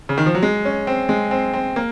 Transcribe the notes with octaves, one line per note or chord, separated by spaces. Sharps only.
C#3
D#3
F3
F#3
G#3
C#4
C4
G#3
C4
C4
A#3